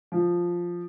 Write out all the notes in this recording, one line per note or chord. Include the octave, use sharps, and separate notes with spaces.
F3